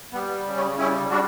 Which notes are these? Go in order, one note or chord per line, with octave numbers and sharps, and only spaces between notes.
G3 B3
C#3
C#4
G3 C#4 E4
G3 D4 F#4